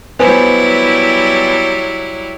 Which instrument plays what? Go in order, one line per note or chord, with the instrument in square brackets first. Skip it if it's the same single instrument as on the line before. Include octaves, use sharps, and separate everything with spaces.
[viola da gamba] F#3 G3 E4 [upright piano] B3 C5 G#5